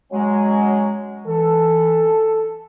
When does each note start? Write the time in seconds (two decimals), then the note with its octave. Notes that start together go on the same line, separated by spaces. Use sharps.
0.13 F#3 G#3 C#4
1.27 E3 A4